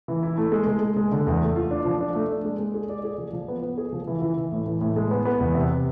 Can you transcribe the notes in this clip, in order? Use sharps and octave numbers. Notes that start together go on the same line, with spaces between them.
E3
E4
A3
G#3
G#3
G#3
G#3
D3
E2
A3
F4
D4
F3
D4
A3
D4
G#3
G#3
G#4
D5
G#4
F3
F3
B3
B3
G#4
F3
E3
E3
E3
A2
E3
A2
G#3
B3
B3
E2
C3